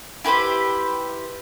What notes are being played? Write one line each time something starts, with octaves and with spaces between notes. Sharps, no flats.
E4 G4 B4 C5